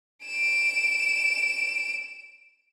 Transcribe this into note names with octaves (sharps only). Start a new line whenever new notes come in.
D7 E7